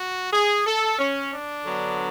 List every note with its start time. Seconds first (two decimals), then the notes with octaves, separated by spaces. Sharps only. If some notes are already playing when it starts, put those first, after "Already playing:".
Already playing: F#4
0.33 G#4
0.66 A4
0.99 C#4
1.32 D4
1.64 D3 F#3 B3